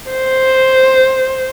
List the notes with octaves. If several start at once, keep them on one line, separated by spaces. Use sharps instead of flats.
C5